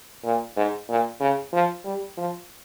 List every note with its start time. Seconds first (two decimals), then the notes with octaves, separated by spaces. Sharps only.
0.25 A#2
0.57 G#2
0.89 A#2
1.20 C#3
1.53 F3
1.85 G3
2.17 F3